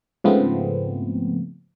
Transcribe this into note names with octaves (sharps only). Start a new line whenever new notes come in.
G#2 C#3 F3 A3 B3 C4